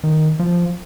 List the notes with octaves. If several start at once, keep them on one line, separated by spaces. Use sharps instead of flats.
D#3
F3